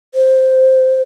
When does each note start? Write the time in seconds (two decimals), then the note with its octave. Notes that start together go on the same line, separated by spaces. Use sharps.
0.15 C5